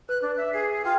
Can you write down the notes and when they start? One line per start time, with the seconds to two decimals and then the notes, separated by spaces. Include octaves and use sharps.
0.09 B4 F#6
0.22 D4
0.37 E5
0.53 G#4 C7
0.85 F4 G5